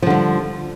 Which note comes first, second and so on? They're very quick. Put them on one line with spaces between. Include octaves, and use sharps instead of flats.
F3 D3 G3